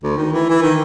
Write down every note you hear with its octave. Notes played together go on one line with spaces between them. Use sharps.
D2
D#3
E3
E3
D#3